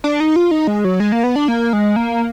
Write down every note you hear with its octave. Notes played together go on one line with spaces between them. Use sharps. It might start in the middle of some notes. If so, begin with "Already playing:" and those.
D4
D#4
F4
D#4
G#3
F#3
G#3
A#3
B3
D4
A#3
G#3
A#3